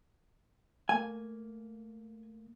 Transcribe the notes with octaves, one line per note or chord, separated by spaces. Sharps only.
A3 A#3 G#5